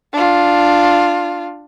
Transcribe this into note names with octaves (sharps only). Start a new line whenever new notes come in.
D4 F4